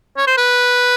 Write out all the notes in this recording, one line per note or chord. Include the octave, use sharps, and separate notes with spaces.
C#5
C5
B4